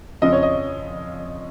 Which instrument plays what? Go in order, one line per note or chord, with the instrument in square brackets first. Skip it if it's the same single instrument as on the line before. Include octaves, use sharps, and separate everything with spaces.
[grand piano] F2 C#3 F3 D#5
C#5
D#5